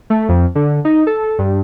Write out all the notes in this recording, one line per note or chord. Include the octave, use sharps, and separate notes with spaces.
A3
F2
D3
D#4
A4
G2